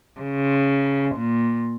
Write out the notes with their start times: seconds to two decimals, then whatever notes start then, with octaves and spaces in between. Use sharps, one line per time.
0.19 C#3
1.14 A#2